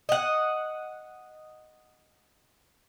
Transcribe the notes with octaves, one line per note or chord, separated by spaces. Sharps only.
D#5 F#5